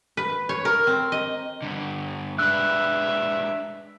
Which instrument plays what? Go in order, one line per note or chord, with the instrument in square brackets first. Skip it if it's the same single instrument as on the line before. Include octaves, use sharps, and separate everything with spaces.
[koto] B4
C#5
A#4
C4
D#5
[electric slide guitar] G2 D3
[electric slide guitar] G#3 D4 B4 [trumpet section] E5 [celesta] E6 F#6